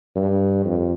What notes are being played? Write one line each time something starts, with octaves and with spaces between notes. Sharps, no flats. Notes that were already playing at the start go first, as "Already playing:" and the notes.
G2
F2